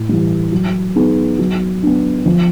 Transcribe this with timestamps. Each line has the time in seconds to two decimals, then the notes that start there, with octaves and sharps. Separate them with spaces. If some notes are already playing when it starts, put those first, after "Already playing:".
Already playing: A2
0.09 E3 G3
0.52 F#3
0.96 B3 D#4 G#4
1.39 F#3
1.83 B3 D4
2.26 F3